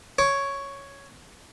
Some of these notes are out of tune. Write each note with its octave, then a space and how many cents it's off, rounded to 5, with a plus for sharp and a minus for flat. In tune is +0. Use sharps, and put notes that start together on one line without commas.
C#5 +0 D6 -25